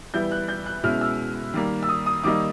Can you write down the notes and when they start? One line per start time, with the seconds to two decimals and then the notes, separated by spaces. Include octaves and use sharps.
0.14 E3 G3 B3 E4 G6
0.32 F#6
0.49 G6
0.66 F#6
0.84 B2 G#3 C#4 E4 F6
1.01 E6
1.54 D#3 G3 A#3
1.83 E6
1.89 D#6
2.06 D#6
2.24 D#3 G3 A#3 D#4 D6